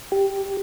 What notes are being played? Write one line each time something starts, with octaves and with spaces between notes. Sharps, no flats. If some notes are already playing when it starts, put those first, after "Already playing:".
G4